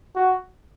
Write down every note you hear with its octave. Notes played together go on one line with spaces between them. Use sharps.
F#4